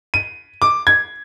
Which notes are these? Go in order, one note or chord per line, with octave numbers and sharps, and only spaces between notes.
D#7
D6
G#6